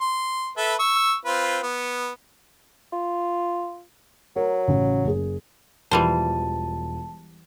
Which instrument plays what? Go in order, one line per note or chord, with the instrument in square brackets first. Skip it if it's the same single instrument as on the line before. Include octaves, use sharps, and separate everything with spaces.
[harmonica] C6
A4 B4 E5
C#6 E6
C4 F4 B4
B3
[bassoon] F4
[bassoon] F#3 [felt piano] A#4
[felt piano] A1 C#3
F#1 G#4
[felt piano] E1 F3 [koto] E3 G3 C5 [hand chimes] A5